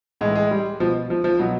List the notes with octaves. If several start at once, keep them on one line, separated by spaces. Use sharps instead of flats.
A2 E3 G#3
G#3
G3
B2 F3
F3
F3
B2 F#3